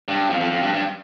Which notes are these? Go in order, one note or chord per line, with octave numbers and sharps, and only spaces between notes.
G2
F2
F2
F2
G2
G2